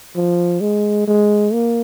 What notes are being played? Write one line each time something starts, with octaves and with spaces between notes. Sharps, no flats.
F3
G#3
G#3
A#3